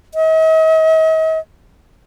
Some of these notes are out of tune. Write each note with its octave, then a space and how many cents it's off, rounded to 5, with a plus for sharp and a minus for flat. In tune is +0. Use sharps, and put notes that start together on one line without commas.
D#5 +45